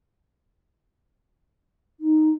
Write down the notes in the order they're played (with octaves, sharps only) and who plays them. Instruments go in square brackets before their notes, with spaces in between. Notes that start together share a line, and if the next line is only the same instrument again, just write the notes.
[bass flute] D#4